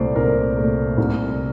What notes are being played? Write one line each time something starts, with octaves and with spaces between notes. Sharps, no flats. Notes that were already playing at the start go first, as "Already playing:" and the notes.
Already playing: C2 A#2 A3 C5 D5
C2 A#4
A#2 A3
C2